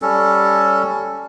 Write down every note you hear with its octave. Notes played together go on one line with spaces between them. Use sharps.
G3 C#4 A4